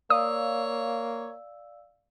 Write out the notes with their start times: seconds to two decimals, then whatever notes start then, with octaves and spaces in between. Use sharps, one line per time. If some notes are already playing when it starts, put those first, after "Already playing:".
0.10 A#3 C#5 D5 F5 D#6 E6